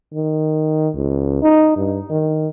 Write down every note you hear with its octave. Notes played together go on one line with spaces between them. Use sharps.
D#3
C#2
D#4
G2
D#3